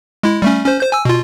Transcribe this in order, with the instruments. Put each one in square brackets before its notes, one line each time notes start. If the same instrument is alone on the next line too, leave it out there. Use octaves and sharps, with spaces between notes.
[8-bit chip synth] G#3 E4
G3 A3 C#4
C#4 C5
C5 G6
G#5 E6
B2 F4